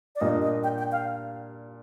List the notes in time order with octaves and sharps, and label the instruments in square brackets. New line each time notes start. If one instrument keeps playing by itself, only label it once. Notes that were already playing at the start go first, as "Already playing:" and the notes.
[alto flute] D5
[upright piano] A#2 G3 A#3 D4 [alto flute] D#5
[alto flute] D#5
G5
G5
F5